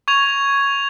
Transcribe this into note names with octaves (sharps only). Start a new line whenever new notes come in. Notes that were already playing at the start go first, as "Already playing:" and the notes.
C#6 G#6 F7